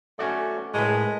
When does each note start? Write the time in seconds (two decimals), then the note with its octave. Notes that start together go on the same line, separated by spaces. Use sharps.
0.19 A3 C#4 F#4 D5
0.74 A2 G#3 A#4 B4